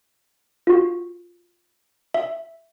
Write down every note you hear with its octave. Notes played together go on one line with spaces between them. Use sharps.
F4 F#4
E5